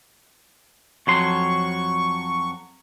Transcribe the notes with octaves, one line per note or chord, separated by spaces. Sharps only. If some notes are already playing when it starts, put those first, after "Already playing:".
F2 F#3 C6 C#6